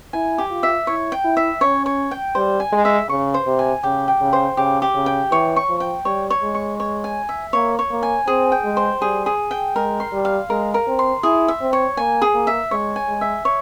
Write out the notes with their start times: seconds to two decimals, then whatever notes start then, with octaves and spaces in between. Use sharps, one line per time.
0.13 E4 G#5
0.38 G4
0.51 F4
0.63 E5
0.87 E4 C#5
1.12 G5
1.24 E4
1.37 E5
1.61 C#4 C#5
1.86 C#5
2.11 G5
2.35 G3 C5
2.60 G#5
2.72 G#3
2.85 E5
3.09 C#3 C#6
3.34 C5
3.46 C3
3.59 G#5
3.83 C#3 G4
4.08 G5
4.21 C#3
4.33 C5
4.57 C#3 G4
4.82 G4
4.95 C#3
5.06 G5
5.31 E3 C#5
5.56 C#6
5.69 F3
5.80 G5
6.05 G3 C#5
6.30 C#5
6.43 G#3
6.55 C#6
6.80 C#5
7.04 G#5
7.29 E5
7.53 A#3 C#5
7.79 C#5
7.91 A#3
8.03 G#5
8.27 C4 G#4
8.52 G5
8.64 G#3
8.77 C5
9.01 G3 G#4
9.26 G#4
9.51 G5
9.75 G#3 A#4
10.00 C6
10.12 G3
10.25 F5
10.50 G#3 A#4
10.74 A#4
10.87 C4
10.99 C6
11.23 E4 G#4
11.48 E5
11.61 C4
11.73 C#5
11.97 A#3 G#5
12.22 G#4
12.34 A#3
12.47 E5
12.71 G#3 C#5
12.96 G#5
13.08 G#3
13.21 E5
13.45 C#5